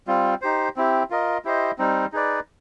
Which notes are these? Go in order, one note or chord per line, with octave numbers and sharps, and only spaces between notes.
G3 C4 F4
D#4 G4 C5
C4 E4 G4
F4 A#4 D#5
E4 G4 C5 D#5
G3 C4 D#4
D#4 G#4 B4 D5